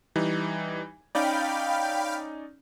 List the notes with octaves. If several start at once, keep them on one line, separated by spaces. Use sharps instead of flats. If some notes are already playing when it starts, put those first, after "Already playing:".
E3 G3 D#4
C#4 D#4 D5 F5 G5 B5